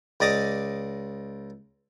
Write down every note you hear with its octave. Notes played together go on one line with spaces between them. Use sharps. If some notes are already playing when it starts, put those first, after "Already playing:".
C#2 D5 D#5 A#5 D6